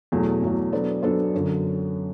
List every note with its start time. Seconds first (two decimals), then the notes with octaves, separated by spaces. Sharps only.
0.12 E2 B2 F#3 A3
0.42 E2 B2 F#3 A3
0.72 F#3 B3 D4 A4 C5
1.03 F#3 B3 D4 A4 C5
1.34 F#2 D3 F#3